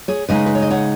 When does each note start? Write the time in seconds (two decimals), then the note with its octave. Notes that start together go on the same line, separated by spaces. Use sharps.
0.08 G#4 C#5
0.29 C#3 G#3 D#4 B4 D#5
0.46 B4
0.55 C#5
0.62 D#5
0.70 C#5 F#5